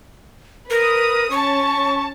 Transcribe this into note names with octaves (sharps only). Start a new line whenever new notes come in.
A#4 B4 D#6
C#4 A5 C#6